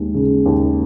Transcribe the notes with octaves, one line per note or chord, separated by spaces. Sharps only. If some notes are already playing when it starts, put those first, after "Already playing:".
Already playing: D#2 G#3
C#3
D#2